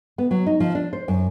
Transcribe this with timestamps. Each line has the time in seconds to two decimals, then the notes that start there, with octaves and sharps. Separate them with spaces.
0.18 B3
0.31 F#3
0.46 D#4
0.60 F3
0.75 D4
0.93 C5
1.08 F#2